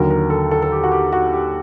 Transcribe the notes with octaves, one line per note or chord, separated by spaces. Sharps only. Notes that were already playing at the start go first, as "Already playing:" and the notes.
Already playing: D#2 D3 F#3 A#4
A#4
A4
A4
A4
G4
F#4
G4
F#4
G4